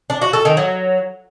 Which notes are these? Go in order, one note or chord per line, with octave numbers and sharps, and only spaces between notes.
D4
F#4
A4
D#3
F#3